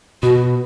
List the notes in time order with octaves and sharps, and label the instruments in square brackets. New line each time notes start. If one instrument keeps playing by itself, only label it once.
[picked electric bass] B2 [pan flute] F#4